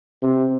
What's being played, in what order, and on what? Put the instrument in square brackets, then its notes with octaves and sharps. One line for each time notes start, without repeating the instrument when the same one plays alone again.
[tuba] C3